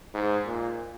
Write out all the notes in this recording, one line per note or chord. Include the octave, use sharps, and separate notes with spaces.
G#2
A#2